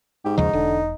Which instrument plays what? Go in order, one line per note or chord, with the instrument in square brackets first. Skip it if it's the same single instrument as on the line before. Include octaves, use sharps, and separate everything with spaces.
[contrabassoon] G#2 [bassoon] G4
[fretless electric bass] D#2 C#3 F3 [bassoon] D#4
[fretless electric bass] E1 [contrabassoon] D3